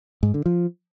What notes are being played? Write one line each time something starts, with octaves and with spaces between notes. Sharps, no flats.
G#2
D3
F3